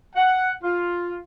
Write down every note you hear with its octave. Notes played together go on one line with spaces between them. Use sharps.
F#5
F4